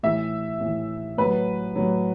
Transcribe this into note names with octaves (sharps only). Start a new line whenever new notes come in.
A2 E3 E5
A2 E3
A2 F#3 B4
A2 F#3